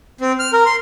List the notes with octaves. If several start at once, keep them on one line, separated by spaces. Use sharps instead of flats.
C4
F6
A#4
C6